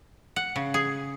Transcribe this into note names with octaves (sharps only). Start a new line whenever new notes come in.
F#5
C#3
G#4